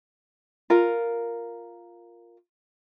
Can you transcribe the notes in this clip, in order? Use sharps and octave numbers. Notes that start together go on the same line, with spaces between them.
F4 A#4